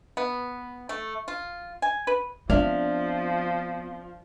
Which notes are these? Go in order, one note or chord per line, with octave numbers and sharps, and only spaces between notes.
B3
A3
F4
G#5
B4
F3 B3 C4 D4 E5 F5